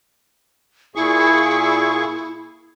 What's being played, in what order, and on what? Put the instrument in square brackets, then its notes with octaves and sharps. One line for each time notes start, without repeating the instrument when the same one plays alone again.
[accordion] A#2 G#4 C#6 [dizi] E4